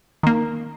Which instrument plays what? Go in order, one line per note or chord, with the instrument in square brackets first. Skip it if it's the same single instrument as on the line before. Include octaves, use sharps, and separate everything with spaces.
[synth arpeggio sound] D#3 A#3